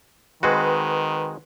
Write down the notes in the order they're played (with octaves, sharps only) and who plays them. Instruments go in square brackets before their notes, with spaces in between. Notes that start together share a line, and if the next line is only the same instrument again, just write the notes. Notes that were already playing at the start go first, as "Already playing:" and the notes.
[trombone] D#3 [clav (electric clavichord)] G#3 C4 F#4 [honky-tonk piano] B4